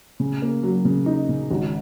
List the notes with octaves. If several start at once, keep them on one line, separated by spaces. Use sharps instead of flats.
C#3
A#3
F#3
C#3
D#4
C#3
G#1